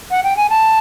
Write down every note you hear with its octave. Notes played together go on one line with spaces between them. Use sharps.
F#5
G5
G#5
A5